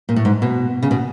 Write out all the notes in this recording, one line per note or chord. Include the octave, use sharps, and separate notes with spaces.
A#2
A2
G#2
B2
C#3
B2